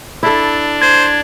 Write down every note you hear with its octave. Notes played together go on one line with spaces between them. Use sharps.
D4 E4 A4
C5 G#6